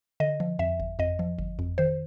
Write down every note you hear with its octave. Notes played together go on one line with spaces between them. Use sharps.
D3 D#5
F3
F2 E5
G1
F2 D#5
F3
G1
F2
D#3 C5